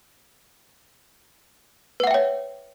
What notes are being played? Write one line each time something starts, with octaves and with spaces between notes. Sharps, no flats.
B4 C#5 E5 F#5 G5